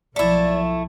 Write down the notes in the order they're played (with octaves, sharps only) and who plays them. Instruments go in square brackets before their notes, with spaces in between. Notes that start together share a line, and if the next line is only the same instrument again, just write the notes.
[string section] B1 F3 [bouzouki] A3 E4 [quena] D5